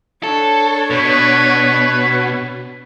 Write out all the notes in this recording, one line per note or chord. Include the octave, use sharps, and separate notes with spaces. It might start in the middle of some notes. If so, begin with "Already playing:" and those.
D4 A4 C#5
B2 B4